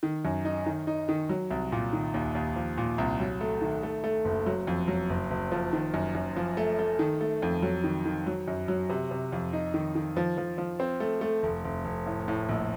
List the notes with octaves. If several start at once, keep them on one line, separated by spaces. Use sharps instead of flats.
D#3
F#2
D#4
D#3
D#4
D#3
F#3
C2
A#2
D#3
D#2
D#2
F3
A#2
C2
F#3
A3
D#3
A3
A3
F#1
F#3
F2
F#3
F#1
F#1
F3
D#3
F#2
F#2
F3
A3
A3
D#3
A3
F2
F#3
D#3
D#3
F#3
F#2
F#3
C3
C3
F2
D#4
D#3
D#3
F3
F3
F3
C4
A3
A3
F1
F1
F1
A2
A2
A#1